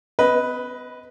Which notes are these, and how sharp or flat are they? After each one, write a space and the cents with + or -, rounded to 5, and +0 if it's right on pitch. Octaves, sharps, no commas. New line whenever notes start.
B3 +35 B4 +0 D#5 +20